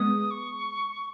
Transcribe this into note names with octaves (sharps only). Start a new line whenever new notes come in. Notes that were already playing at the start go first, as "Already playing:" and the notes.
Already playing: G#3 B3 D#6
C#6